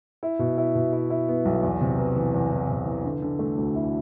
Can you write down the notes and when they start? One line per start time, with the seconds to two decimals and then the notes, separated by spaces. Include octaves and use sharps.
0.23 E4
0.39 B2
0.58 E4
0.75 B2
0.93 E4
1.10 E4
1.28 B3
1.45 B1
1.63 E2
1.81 C3
1.99 E3
2.16 E3
2.34 E2
2.52 E3
2.69 C3
2.86 E3
3.05 D3
3.22 D3
3.39 A3
3.57 D2
3.75 E4